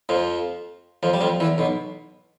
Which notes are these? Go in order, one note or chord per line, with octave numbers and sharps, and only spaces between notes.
F2 F3
F2 F3
G3
F2 F3
E2 E3
B1 B2